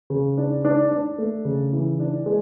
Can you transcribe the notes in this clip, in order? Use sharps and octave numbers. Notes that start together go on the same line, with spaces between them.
C#3
D4
D4
D4
A3
C#3
E3
D4
G#3